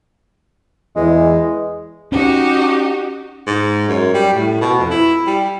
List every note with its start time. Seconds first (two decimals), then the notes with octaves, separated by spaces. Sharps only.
0.96 E2 G#3
2.12 C#4 D#4 F#4 G4
3.47 G#2
3.88 F#2
4.14 G3
4.33 A2
4.61 B2
4.79 F2
4.91 E4
5.27 G3